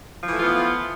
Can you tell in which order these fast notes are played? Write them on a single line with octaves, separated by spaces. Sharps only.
F3 E3 A3 F4 B3